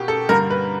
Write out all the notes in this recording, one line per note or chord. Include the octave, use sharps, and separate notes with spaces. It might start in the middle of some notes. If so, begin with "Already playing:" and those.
Already playing: B2 A#3 G4
A4
G2 D3 G3 A#3 A#4
B4